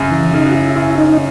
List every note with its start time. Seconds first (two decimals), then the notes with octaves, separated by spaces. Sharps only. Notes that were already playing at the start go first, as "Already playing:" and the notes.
Already playing: F#2 C#3
0.11 E3
0.33 C#3 D#4
0.46 F#4
0.55 E4
0.76 F#2 E4
0.98 D#4